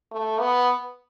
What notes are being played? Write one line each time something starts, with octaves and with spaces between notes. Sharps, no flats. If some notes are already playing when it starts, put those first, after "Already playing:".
A3
B3